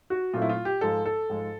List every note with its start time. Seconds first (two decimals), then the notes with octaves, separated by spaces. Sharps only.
0.10 F#4
0.34 A#2 F#3 A3 C4 F4
0.42 E4
0.49 F4
0.65 G4
0.81 G#2 F3 G#3 A4
1.06 A4
1.30 G#2 F3 G#3